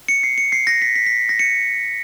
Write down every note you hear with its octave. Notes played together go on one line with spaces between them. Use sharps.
C#7
C7
C#7
C7
A#6
B6
B6
B6
A#6
C#7